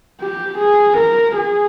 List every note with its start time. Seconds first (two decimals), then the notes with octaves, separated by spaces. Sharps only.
0.21 G4
0.58 G#4
0.97 A#4
1.36 G#4